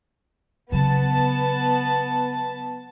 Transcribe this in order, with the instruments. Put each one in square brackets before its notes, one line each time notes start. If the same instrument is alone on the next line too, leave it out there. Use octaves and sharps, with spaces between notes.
[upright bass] C#3 F#3 [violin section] B3 A5